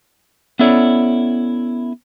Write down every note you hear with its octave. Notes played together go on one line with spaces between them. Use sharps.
B3 C#4 E4 A4 C#5 D5